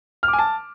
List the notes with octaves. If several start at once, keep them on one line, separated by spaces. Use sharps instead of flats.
F6
D6
G#5
A5